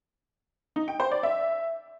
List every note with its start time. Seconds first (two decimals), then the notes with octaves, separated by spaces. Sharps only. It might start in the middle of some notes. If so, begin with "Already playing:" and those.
0.76 D#4
0.88 G5
1.00 C5
1.11 D5
1.23 E5